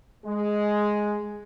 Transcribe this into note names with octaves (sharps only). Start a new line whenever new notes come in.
G#3